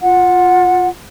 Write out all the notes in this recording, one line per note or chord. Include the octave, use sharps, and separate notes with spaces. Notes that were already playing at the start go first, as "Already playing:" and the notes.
F4 F#5